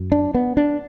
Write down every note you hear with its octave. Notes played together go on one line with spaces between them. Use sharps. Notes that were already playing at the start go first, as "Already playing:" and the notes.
Already playing: F#2
D4
B3
D4